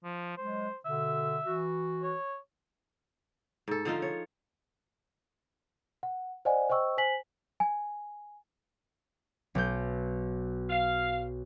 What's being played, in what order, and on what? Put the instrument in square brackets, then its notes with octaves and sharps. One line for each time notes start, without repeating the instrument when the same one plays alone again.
[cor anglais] F3
[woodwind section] F#3 G#3 [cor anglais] C5
[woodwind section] B2 D3 [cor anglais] E5
[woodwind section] E3 F#4
[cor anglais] C#5
[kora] G#2 A4
D3 F3 D#4 F4
C#5
[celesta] F#5
C5 D5 D#5 F#5 G#5
C5 D#5 G5 C#6 E6
C5 G#5 B6 F#7
G#5
[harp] B1 G6
[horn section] F5